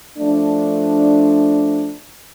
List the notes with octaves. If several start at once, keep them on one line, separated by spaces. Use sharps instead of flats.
F3 A3 D4